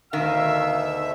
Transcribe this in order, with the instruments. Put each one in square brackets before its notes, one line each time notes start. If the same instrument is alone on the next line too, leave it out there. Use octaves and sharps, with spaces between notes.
[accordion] D2 B2 E5 [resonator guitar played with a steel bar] D#3 [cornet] F5 [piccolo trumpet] E6